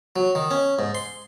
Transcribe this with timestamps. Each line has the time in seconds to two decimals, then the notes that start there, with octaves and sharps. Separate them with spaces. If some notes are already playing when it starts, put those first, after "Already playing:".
0.16 F#3
0.35 D#3
0.51 C#4
0.79 G#2
0.95 C6